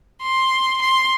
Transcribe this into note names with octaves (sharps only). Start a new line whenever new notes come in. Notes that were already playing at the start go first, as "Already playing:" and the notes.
C6
C6